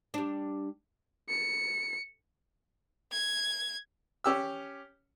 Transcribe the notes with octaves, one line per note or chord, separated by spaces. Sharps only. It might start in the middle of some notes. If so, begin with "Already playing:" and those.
G3 D4
C#7
G#6
C#4 G4 E6